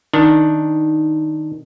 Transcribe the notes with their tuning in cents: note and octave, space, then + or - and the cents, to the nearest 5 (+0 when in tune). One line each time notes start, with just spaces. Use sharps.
D#3 +0 D4 +0